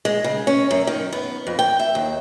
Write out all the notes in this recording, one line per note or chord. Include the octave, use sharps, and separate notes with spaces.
G#3
C#3
C#4
F#2
D#3
B3
F2
G5
E5
D#2